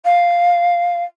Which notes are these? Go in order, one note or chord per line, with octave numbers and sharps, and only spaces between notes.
F5